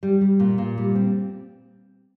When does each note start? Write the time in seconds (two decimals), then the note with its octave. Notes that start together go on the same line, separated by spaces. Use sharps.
0.03 G3
0.21 G3
0.40 A#2
0.58 A#2
0.78 G3
0.95 C4